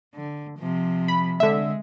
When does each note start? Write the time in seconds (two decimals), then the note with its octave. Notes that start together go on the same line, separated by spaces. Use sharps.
0.15 D3
0.58 C3 F3
1.08 B5
1.40 D3 G#3 E5